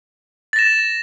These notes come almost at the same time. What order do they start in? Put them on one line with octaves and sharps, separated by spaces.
A6 A#6 E7